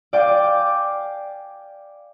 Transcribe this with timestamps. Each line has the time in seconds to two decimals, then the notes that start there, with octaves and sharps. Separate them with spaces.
0.13 D5 F5 G5 G#5 D6